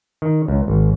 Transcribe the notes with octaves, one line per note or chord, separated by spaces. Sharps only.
D#3
C#2
G#1